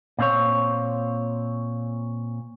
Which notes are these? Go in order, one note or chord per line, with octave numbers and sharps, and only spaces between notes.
A#2 C4 C#5